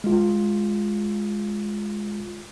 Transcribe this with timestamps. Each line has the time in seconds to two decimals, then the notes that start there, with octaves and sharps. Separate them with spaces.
0.04 G#3 F4